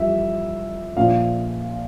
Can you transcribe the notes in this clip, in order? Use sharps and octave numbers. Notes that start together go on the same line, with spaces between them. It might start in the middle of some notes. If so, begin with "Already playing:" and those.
Already playing: F2 E3 G3 E5
A#1 A#2 F3 F5